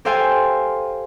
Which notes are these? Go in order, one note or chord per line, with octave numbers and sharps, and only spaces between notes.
G4 A4 C5 F5 G5 G#5